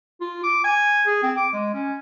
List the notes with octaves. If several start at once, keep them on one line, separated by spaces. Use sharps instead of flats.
F4
D6
G#5
G#4
C4
D6
G#3
C#4